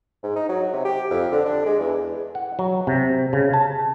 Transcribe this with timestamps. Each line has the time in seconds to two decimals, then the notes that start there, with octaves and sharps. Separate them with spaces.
0.23 G#2
0.36 D#4
0.49 F#3
0.73 C3
0.85 G4
1.11 F2
1.31 D3
1.46 D4
1.65 G#3
1.80 E2
2.35 F#5
2.59 F#3
2.87 C3
3.33 C#3
3.54 A5